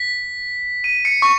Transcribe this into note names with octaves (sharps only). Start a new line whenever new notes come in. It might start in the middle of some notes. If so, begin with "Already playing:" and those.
Already playing: B6
D#7
C#7
C#6